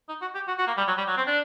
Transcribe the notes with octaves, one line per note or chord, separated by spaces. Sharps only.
D#4
F#4
G4
F#4
F#4
A#3
G3
F#3
G3
F#3
C4
D4